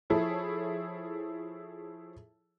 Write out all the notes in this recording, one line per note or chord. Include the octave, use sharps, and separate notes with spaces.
F3 E4 G#4 A4 C#5